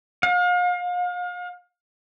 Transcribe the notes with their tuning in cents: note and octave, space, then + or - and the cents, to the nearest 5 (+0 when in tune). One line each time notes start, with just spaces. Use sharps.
F5 +40